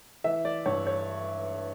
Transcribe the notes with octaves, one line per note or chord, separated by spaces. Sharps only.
E3 E5
D5
G2 C#5
C#5